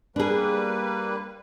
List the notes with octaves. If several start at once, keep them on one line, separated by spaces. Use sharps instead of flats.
G3 A#3 D4 G#4 B4